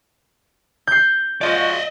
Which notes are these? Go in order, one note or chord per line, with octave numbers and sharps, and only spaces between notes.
G6 C7
F3 G#3 F#4 D5 D#5